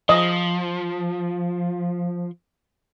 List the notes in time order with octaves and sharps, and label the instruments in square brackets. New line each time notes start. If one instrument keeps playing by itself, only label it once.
[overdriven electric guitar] F3 [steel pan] D#5